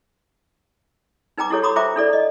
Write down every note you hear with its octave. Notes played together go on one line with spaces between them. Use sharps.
D#4 B4 G5 A#5 D6
E4 G4 A4 C#5
F#4 G4 A#5 B5 D6 D#6
F4 C5 E5 G5 A#5 D6
D4 E4 A4 D5
D#5